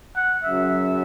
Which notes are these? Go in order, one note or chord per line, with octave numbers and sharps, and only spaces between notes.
F#5
F#2 C#3 F#3 E5